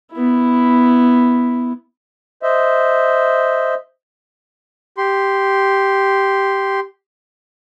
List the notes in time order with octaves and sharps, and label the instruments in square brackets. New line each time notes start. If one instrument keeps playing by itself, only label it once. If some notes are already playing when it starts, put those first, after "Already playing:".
[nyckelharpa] B3 E4
[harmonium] C5 D#5 E5
[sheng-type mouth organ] G4 C6